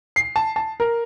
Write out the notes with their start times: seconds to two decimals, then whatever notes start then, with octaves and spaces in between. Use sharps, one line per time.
0.16 C7
0.36 A5
0.56 A5
0.80 A#4